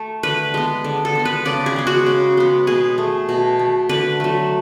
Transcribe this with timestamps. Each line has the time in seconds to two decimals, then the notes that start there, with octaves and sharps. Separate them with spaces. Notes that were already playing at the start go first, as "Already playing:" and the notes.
Already playing: A3 A4
0.23 D3 B4
0.54 G#3 B3
0.84 D3
1.05 A4
1.15 G#3 B3
1.25 B4
1.45 C#3 D5
1.66 G#4
1.76 G#3 B3
1.87 F#4
2.06 C#3
2.37 G#3 B3
2.67 B2 G#4
2.98 A3
3.29 B2
3.59 A3
3.89 D3 B4
4.20 F#3 A3